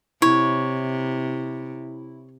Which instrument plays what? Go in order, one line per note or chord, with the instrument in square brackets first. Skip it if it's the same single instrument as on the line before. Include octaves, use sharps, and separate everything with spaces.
[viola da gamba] C3 [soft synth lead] E4 [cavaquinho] C#5